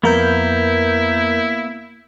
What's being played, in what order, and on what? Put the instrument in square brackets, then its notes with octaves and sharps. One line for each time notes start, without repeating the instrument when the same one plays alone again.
[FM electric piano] F2 A#4 G6 [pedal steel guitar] A#3 B3 [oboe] E4